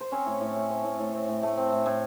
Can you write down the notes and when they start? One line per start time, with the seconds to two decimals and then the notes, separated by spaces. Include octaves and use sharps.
0.01 C5
0.12 C4 C#4 C#5
0.26 A2
0.41 A2
0.56 A3
0.70 C4
0.84 A2
0.99 A2
1.13 C4
1.29 A2
1.43 A3
1.58 C4
1.72 A2
1.86 A2